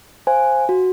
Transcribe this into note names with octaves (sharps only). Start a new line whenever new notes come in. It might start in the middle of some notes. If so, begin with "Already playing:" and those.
C5 F5 G#5
F#4